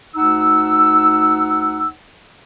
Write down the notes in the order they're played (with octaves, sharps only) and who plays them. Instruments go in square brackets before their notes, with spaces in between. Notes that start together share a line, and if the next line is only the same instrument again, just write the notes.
[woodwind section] D2 D#4 F#5 E6